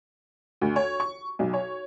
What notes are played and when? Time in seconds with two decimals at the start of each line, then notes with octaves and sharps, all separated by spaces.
0.61 D2
0.76 C#5
1.00 C#6
1.39 B1
1.53 C#5